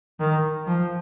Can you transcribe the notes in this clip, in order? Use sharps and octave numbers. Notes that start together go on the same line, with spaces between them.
D#3
F3